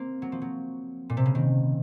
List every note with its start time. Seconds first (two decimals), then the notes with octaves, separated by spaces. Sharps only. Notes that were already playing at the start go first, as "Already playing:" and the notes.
Already playing: A#3 C4
0.22 F#3
0.32 F3
0.42 F#3
1.10 A#2
1.17 C3
1.26 C#3
1.35 D#3